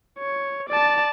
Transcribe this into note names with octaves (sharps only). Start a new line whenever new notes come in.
C#5
D5 A5